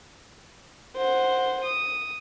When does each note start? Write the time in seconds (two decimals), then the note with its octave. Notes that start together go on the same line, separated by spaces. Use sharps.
0.97 C5 F#5
1.65 D#6